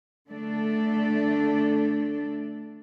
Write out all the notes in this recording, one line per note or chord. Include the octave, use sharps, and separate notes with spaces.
D3 A3 D4 A4